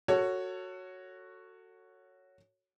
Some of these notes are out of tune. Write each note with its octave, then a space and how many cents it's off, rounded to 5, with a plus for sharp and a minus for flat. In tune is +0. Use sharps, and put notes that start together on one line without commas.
F#4 +0 A4 +30 C#5 +0